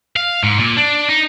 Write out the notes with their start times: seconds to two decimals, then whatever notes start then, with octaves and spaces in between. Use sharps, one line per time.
0.16 F5
0.43 G#2
0.60 A#2
0.77 D4
1.09 D#4